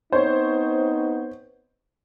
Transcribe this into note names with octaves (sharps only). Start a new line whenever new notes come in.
B3 C4 D#4 C5 C#5